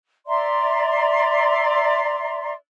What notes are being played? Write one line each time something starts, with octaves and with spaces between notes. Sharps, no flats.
D5 E5 A#5 C6